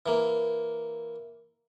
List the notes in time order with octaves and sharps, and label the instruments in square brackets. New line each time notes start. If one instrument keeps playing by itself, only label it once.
[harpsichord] E3 A#3